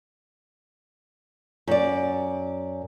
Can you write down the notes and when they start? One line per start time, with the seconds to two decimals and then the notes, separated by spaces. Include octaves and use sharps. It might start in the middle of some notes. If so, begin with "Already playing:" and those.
1.67 F#2 D5